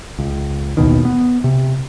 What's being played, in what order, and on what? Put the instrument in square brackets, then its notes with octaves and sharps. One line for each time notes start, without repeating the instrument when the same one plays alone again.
[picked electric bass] C#2
A1 D#2 B2 D#3
B3
C3